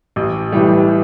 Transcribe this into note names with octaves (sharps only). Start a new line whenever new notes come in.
A1
A2 E3 G3